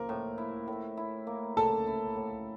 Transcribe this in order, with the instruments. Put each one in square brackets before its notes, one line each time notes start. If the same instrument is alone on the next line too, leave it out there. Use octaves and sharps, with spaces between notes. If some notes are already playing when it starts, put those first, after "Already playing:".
Already playing: [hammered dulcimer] F3 A#3 [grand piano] A#4
[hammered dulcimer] A2
E4
A2
E4
A#3
[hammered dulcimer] A2 [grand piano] A4 A5
[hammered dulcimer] E4
A2